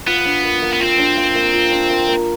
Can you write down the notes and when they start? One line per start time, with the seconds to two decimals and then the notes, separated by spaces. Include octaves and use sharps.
0.07 B3 F4
0.25 D4
0.44 A#3
0.62 A#3
0.73 B3
0.80 C4 F4
0.98 D4
1.17 A#3
1.35 A#3
1.53 F4
1.72 D4
1.90 A#3
2.08 A#3